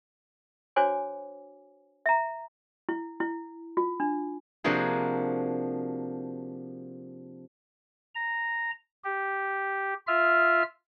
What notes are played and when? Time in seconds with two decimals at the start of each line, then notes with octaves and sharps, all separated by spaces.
0.76 D4 F#4 C5 C#5 G#5 D6
2.06 E5 A#5
2.89 E4
3.20 E4
3.77 F4
4.00 D4
4.64 C3 F3 A#3 D4 F#4 G#4
8.15 A#5
9.04 G4
10.07 F4 E5 F6